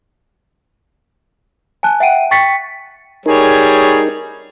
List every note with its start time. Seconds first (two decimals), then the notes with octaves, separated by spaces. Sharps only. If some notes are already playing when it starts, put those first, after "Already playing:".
1.83 G#5 A5 F#6
2.00 E5 F#5 G5 D7 D#7
2.31 G5 C#6 A6 B6 C#7
3.26 G3 D#4 G#4 A#4 C#5